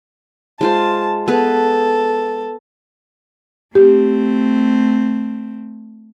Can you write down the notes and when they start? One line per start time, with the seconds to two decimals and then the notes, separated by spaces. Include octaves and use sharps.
0.61 G#3 F4 C5 A5
1.28 B3 G#4 A4 B4
3.75 A3 C4 G4